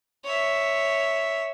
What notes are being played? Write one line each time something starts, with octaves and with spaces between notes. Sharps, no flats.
C#5 E5